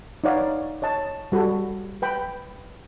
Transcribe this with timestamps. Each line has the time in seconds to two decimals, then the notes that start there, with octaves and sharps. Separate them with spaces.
0.24 D#4 B4 C#5 D5 F5 F#5
0.82 C#5 D#5 A5
1.32 G3 F#4 A4 B5
2.02 B4 G5 B5